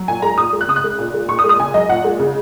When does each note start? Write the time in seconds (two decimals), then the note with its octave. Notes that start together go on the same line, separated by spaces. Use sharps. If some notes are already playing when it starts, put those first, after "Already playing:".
Already playing: F#3
0.08 A#2 G#5
0.22 G#3 A#5
0.38 A#2 D#6
0.53 G#3
0.61 F#6
0.68 C#3 D#6
0.76 F#6
0.84 G#3
0.99 A#2
1.14 G#3
1.28 A#2 C#6
1.39 D#6
1.44 G#3
1.49 D#6
1.59 C#3 G#5
1.74 F#3 D#5
1.89 A#2 F#5
2.04 G#3
2.19 C#3